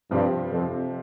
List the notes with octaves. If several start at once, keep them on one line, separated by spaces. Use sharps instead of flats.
G2 C3 F3 C4 G4
F2